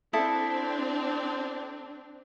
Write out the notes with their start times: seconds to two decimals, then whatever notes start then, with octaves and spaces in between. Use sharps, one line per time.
0.13 C4 D4 E4 A4 D#6